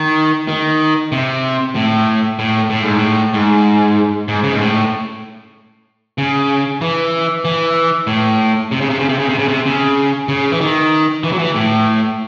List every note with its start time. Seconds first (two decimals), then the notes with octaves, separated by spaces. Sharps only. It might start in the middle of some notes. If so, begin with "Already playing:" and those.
Already playing: D#3
0.48 D#3
1.12 C3
1.75 A2
2.39 A2
2.70 A2
2.83 G#2
2.96 A2
3.34 G#2
4.28 G#2
4.43 C#3
4.53 G#2
4.60 A2
6.18 C#3
6.81 E3
7.45 E3
8.07 A2
8.72 C3
8.81 C#3
8.90 C3
9.00 C#3
9.09 C3
9.19 C#3
9.29 C3
9.38 C#3
9.48 C3
9.66 C#3
10.29 C#3
10.51 E3
10.61 D#3
11.24 E3
11.32 F#3
11.39 E3
11.55 A2